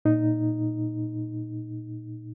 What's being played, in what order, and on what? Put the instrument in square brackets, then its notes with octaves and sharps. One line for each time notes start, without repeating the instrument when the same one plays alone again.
[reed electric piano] A#2 D#4